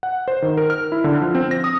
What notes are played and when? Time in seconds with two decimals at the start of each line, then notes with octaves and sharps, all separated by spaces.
0.03 F#5
0.28 C5
0.42 D#3
0.57 A#4
0.70 F6
0.92 E4
1.04 D3
1.21 F3
1.35 C4
1.51 A#6
1.64 D#6